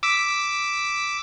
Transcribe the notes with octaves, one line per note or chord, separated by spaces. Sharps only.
D6 E6 B6